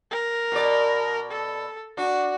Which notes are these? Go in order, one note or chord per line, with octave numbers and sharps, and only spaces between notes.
A#4
B2 D5
A4
D4 F#4